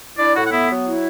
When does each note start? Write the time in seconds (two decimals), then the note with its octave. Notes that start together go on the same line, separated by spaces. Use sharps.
0.17 D4 E4 D5
0.34 A2 F#4 F#5
0.46 F#5
0.51 B3 E4 E5
0.69 F#3
0.85 E4